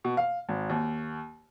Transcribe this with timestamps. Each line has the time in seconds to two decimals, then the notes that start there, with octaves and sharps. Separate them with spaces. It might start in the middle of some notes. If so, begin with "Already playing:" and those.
0.04 B2
0.17 F5
0.49 G#1
0.69 D#2